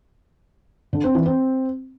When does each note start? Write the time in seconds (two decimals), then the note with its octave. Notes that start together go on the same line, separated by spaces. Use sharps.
0.93 D3
1.04 C4
1.15 E3
1.26 C4